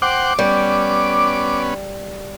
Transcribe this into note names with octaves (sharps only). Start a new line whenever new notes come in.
C5 F#5 G5 D6
G3 B3 C#4